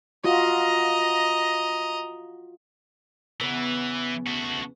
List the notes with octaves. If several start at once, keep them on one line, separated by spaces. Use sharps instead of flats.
F4 F#4 D#5 A#5
E2 C#3 E3 B3
A3 F#4